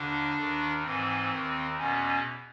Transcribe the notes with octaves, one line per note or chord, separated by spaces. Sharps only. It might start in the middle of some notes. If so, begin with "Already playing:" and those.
Already playing: D#2 D3 D4
D#2 D#3
G#2 E3 C4
D#2 D#3
E2 B2 C#4